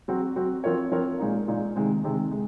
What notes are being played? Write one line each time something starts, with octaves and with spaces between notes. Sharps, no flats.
F#3 C4 F#4
F#3 C4 F#4
F3 C4 F4 A#4 C#5
F3 C4 F4 A#4 C#5
A#2 G#3 D#4
A#2 G#3 D#4
C3 D#3 G#3 C4
C3 D#3 G#3 C4
G#3